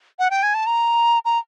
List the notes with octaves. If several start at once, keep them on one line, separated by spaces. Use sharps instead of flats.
F#5
G5
G#5
A5
A#5
A#5